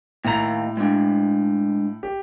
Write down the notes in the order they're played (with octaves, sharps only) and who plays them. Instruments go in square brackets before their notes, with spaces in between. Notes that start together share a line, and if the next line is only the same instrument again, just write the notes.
[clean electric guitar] D#2 A#5 [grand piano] A2 F7
[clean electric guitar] G#3 D4
[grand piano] G4